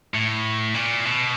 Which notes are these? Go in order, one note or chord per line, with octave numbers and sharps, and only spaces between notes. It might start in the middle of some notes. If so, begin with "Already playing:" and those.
A2
A#2
B2